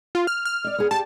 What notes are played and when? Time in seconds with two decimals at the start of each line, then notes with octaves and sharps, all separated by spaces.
0.15 F4
0.27 F6
0.45 F6
0.64 D5 D#5
0.78 B3 G#4
0.91 G4 A5